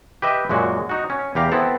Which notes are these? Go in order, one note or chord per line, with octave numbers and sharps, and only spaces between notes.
G4 B4 D#5 E5
F#2 A#2 G#3 F#4
D#4 F#4
C#4
E2 G4 F5 A#5
B3 C4 E4 A4